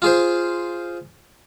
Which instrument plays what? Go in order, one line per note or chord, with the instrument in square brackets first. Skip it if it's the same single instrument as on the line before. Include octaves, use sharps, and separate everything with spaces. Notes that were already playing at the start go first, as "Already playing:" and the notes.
[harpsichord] F4 G#4 C5